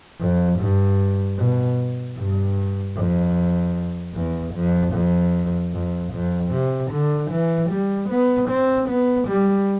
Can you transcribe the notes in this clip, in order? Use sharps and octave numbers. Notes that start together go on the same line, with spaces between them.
F2
G2
B2
G2
F2
E2
F2
F2
F2
F2
C3
D3
E3
G3
B3
C4
B3
G3